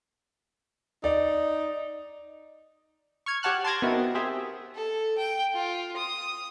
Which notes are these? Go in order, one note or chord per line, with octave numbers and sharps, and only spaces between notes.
D#4 D5
C#6 F6 G#6
G4 C#5 F#5 A5 F6 F#6
A5 C6 D6 G#6 A#6
B3 C4 D#4 E4 F#4 A#4
G4 G#4 C5 E5
A4
G5
F4
D#6